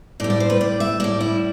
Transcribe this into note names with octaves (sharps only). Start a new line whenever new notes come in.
A2 G3 D5
D5
C5
B4
D5
E5
A2 G3 D5
E4